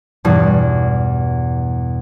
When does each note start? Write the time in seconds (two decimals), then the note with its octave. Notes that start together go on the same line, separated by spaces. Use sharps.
0.25 E2 G2 B2 G3